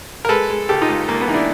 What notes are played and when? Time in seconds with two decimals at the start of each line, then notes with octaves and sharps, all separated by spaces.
0.25 A#4
0.29 G#3 A4 B4
0.50 G#3
0.69 C#2 G4 A4
0.82 D#4 F4
0.88 C#2
1.08 C#2 A#3
1.21 B3
1.27 E3 D#4
1.34 D4 E4